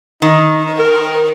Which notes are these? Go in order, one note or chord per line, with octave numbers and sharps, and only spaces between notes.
D#3 D#4
A#4